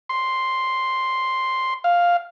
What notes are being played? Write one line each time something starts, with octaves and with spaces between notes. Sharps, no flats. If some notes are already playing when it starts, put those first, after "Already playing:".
C6
F5